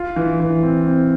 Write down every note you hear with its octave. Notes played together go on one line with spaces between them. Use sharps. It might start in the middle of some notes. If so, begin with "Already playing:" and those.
Already playing: F4
E3
E3
C4
C4